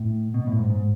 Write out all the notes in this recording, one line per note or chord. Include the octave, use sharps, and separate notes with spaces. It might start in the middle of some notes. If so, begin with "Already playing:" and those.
Already playing: A2
B2
A2
G#2
G#2